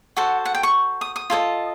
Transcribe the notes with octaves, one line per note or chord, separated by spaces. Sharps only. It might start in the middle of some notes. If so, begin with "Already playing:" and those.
F#4 A4 C5 F#5
F#5
G5
C#6
D#6
D#6
F4 A4 C5 D#5